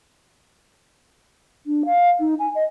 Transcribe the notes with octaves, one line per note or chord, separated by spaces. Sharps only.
D4
F5
D#4
G#5
D#5